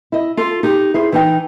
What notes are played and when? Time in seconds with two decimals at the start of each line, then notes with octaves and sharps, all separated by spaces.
0.12 E4 D#5
0.37 F4 A4
0.63 D#4 G4
0.94 E4 G#4 C5
1.12 E3 D#4 G5